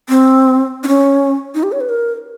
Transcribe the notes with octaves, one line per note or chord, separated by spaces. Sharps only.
C4
D4
C#4
D#4
G4
C#5
B4
A#4